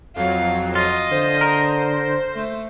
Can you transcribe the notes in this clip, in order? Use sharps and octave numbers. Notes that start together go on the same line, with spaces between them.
F2 F#3 F4
F4 D#5
D3 C5
A#4
A3